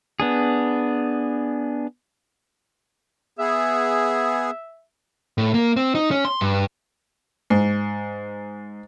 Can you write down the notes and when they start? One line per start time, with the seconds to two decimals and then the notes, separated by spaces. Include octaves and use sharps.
0.20 B3 D4 G#4
3.39 B3 G#4 E5
5.38 A2
5.54 A#3
5.76 C4
5.95 D#4
6.11 C#4
6.25 C6
6.41 G2
7.50 G#2